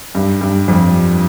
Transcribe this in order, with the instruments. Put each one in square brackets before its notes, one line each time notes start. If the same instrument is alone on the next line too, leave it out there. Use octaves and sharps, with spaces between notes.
[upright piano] G2
G2
F2